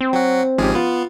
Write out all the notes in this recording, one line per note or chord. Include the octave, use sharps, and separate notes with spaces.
C4
F#3 F#4
G#1 G#2 F3 C#4 G4 G#4
B3 F4